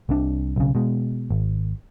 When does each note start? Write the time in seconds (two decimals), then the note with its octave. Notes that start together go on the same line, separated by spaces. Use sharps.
0.09 C2 C3 D4
0.56 B1 C#3
0.75 B2 G#3
1.30 G#1